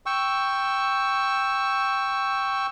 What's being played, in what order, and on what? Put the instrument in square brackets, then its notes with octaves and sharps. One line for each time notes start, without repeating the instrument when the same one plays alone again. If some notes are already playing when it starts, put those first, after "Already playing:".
[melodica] G5 C#6 E6